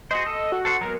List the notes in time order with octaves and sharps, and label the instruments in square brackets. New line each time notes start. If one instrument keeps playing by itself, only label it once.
[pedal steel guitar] F#4 G#4 C5 [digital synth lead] D#5
[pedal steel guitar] A4
[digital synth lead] F#4
[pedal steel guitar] A4 C5 F#5
[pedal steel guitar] F#3 G#3 B3 [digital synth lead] A#4